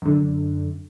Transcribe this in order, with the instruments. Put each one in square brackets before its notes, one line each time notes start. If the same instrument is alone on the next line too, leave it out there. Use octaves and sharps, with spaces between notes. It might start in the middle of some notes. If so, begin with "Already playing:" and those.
[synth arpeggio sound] F#2 D3